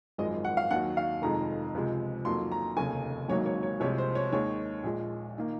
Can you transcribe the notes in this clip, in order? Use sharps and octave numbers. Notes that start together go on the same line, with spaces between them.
G#1 F#2 F3 G#3 D#5
F#5
F5
D#2 D#3 F#3 F#5
F5
F1 F2 D#3 G#3 A#5
C#2 C3 F3 G#3
F2 D#3 F#3 A#3 C6
A#5
F1 D#2 C#3 G#5
G#1 G#2 F#3 A#3 C#5
C#5
C#5
C2 C3 F3 G#3 C#5
C5
C#5
D#2 D#3 G#3 C#5
A#1 A#2 G#3
D#3 A#3